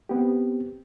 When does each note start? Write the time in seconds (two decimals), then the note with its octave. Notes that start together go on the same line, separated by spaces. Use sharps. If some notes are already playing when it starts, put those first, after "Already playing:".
0.09 B3 C4 G4